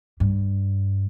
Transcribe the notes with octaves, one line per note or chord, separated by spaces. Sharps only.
G2